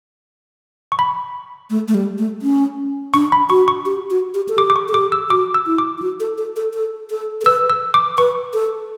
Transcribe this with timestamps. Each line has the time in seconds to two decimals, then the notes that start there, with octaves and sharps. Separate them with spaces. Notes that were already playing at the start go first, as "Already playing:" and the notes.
0.92 C#6
0.99 B5
1.70 A3
1.88 A3
1.95 G3
2.18 A3
2.42 C#4
3.14 D4 C#6
3.32 B5
3.50 F#4 C#6
3.68 C#6
3.85 G4
4.10 F#4
4.34 G4
4.49 A4
4.58 G4 D6
4.70 D6
4.76 C#6
4.88 A4
4.94 G4 D6
5.12 E6
5.30 F#4 D6
5.54 E6
5.66 E4
5.78 D6
5.98 E4
6.02 F#4
6.20 A4
6.38 A4
6.56 A4
6.74 A4
7.10 A4
7.41 A4
7.45 B4 E6
7.70 E6
7.94 D6
8.18 B4 C#6
8.54 A4